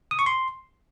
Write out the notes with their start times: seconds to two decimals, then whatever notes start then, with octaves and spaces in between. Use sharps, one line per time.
0.11 D#6
0.19 C#6
0.26 C6